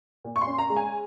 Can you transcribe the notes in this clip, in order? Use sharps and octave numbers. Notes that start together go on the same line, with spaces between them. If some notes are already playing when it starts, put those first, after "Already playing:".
A#2
C#6
C6
C#4
A#5
G#3
G#5